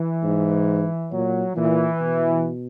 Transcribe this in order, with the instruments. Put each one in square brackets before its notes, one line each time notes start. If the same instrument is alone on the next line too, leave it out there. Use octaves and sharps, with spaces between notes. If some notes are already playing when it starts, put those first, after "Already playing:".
Already playing: [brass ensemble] E3
[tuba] G#2
[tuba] A#2 [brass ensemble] F#3
[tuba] A#2 [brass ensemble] E3
[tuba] B2